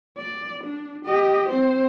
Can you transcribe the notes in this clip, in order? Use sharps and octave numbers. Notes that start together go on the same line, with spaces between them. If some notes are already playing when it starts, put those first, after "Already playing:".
D5
D4
G4 D#5
C4 C5